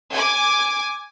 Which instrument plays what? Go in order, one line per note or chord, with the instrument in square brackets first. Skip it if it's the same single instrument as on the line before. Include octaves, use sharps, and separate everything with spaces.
[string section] G#5 D6